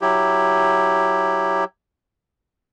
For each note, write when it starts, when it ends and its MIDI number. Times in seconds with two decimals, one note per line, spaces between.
0.01 1.64 54
0.01 1.64 64
0.01 1.64 67